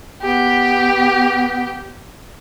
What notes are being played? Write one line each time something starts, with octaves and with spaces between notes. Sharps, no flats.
B3 G4